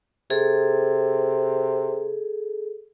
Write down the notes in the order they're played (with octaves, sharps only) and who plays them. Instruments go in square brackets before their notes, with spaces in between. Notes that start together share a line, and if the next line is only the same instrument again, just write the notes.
[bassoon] C3 [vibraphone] G#4 A4